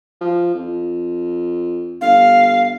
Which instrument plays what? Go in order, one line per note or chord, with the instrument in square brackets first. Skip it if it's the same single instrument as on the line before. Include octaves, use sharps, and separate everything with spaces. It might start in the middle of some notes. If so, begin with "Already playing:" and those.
[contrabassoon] F3
F2
[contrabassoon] G1 [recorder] F5